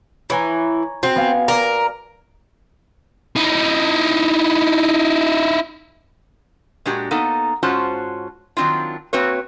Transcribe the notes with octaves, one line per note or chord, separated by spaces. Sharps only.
E3 C#5 G#5 A#5
C4 F#4
B3 F5 G#5
A#4 D5 A#5
D#4 E4
A#2 G#3 D4 F#4 G4
A#3 B3 D#4 A4
G#2 C#4 F4 F#4 C5 A5
D#3 F#3 C4 D4 F4
A#3 C4 F#4 B4 C#5